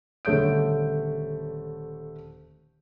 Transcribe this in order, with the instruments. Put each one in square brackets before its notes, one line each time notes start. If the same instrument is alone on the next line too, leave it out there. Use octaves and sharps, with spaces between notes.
[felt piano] D#1 D3 A3 C#5 G6 D7